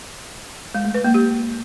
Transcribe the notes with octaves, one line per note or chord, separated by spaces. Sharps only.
G#3
A3
B4
A#3
G4